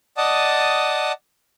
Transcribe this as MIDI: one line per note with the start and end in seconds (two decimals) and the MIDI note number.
0.17 1.12 74
0.17 1.12 75
0.17 1.12 78
0.17 1.12 81
0.17 1.12 87